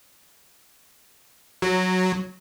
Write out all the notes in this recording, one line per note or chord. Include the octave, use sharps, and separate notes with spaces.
F#3